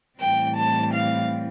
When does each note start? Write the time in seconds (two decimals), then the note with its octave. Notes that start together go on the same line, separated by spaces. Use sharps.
0.19 A2 E3 G3 C4 G5
0.57 A5
0.94 F5